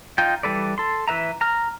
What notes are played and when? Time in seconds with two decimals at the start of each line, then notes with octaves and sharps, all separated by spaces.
0.18 D#4 F4 G5
0.43 E3 G3 A4 B4 D5
0.78 A4 C6
1.08 E3 B4 E5 A#5
1.41 A#5 F6